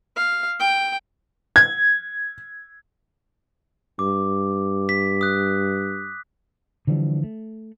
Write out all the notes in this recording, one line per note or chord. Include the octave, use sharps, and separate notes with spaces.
F5
G5
G#6
G2 D6
B6
D#6 F#6
D3 E3 F3 G3
A3